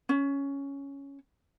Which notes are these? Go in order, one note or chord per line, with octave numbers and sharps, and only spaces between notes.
C#4